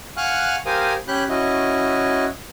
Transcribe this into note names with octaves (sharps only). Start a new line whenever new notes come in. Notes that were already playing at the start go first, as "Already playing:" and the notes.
F5 F#5 G#5 C#6 F6 F#6
G4 A#4 C5 F5 G#5 D#6
C#4 G4 B5 F#6 G6
C#4 E4 F#4 D#5